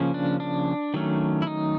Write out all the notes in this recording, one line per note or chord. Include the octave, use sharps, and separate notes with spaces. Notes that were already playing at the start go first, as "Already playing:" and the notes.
Already playing: C#3 F3 A#3 C#4
D4
D4
D#3 F#3 A3 C#4
E4
D#4